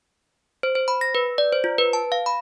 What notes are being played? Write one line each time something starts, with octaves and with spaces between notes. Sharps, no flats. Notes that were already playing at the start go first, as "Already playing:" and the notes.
C5
C5
B5
A#6
B4
D5
C5
F4
B4
A5
F5
B5